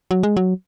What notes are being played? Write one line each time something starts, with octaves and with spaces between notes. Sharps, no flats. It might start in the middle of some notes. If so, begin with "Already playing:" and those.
F#3
G#3
F#3